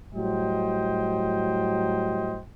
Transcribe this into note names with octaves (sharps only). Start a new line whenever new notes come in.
A2 F#3 G3 C5 D#5 G5